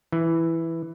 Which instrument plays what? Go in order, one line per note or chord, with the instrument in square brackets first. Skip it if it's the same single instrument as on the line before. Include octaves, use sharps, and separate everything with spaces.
[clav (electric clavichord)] E3